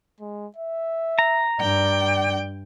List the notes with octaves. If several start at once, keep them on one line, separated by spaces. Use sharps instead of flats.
G#3
E5
A#5
G2 D5 G5